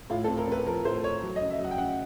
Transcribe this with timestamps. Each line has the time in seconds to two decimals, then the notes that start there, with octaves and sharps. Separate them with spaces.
0.10 A2 F4
0.24 A4
0.28 C4
0.38 A#4
0.48 C4 B4
0.67 F3 A#4
0.85 A2 C5
1.03 A3 C#5
1.22 F#3
1.36 D#5
1.41 C#3
1.50 E5
1.59 F#3
1.64 F#5
1.71 G5
1.78 C#3 F#5